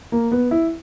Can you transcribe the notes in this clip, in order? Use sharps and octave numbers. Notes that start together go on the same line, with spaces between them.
A#3
B3
E4